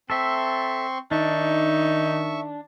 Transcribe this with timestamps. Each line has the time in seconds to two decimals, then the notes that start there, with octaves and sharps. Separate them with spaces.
0.10 C4 A4 E5 C6 C#6
1.11 D#3 D4 D#4 E5 C#6